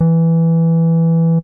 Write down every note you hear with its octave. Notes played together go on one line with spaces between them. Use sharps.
E3